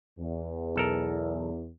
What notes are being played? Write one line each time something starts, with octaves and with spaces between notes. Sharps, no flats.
E2
B1 A4 A#4